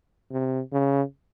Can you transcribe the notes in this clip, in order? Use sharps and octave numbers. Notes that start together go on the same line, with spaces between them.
C3
C#3